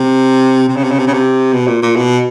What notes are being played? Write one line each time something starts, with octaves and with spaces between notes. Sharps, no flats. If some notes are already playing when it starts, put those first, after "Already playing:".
Already playing: C3
C3
C#3
C3
C#3
C3
C#3
C3
B2
A#2
A#2
B2